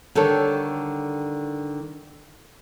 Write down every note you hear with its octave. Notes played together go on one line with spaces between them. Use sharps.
D3 D#3 G3 A4 C#5